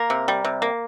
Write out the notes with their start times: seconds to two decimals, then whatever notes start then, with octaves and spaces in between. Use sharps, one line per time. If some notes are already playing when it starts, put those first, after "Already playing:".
Already playing: A#3 A#4
0.10 C3
0.28 G3
0.45 C3
0.62 A#3